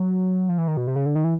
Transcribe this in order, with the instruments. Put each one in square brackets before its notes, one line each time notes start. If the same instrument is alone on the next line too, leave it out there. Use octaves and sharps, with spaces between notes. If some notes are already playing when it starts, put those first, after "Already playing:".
Already playing: [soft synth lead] F#3
F3
E3
D#3
B2
C3
C#3
D3
D#3
E3